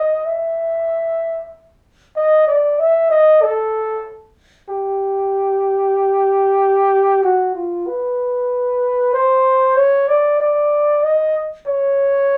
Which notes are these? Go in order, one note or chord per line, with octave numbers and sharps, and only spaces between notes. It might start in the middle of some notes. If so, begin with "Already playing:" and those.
Already playing: D#5
E5
D#5
D5
E5
D#5
A4
G4
F#4
F4
B4
C5
C#5
D5
D5
D#5
C#5